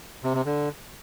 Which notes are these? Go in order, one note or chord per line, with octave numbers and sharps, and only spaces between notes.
C3
C3
D3